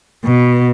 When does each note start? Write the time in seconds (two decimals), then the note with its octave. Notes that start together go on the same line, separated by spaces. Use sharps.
0.24 B2